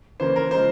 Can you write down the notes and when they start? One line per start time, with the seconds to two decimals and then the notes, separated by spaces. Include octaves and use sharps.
0.20 C#3 E3 A#3 C#4 C5
0.36 A#4
0.51 C#3 F3 G#3 C5